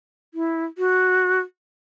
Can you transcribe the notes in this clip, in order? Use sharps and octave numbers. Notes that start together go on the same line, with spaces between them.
E4
F#4